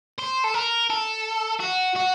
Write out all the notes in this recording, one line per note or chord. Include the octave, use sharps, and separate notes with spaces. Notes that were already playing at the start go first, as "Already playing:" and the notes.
C5
A4
A#4
A4
F#4
F#4